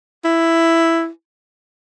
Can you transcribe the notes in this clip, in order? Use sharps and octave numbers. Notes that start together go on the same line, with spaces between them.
E4